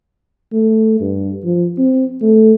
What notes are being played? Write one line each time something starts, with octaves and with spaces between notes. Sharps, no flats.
A3
G2
F3
C4
A3